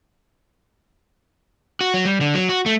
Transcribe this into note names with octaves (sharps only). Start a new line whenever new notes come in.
F#4
F#3
G3
D3
F#3
F#4
A3